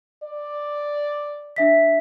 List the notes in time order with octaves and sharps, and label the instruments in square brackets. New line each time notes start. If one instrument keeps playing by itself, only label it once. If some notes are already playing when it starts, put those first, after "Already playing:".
[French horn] D5
[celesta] D4 E5 B6